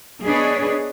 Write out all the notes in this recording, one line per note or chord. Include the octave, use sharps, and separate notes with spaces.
B3 D4 G#4 B4 C#5 D#5